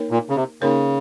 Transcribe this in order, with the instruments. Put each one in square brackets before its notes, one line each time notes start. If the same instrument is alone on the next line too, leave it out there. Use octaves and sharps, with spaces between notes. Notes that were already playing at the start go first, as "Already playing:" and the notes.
Already playing: [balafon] A#3 D#4 A#4 C#5
[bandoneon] A#2
C#3
C3
[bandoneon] C#3 [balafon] A#3 D#4 A#4 C#5